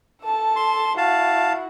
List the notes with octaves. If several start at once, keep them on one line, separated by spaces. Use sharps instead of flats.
A4 A5
C6
E4 F#4 F5 A5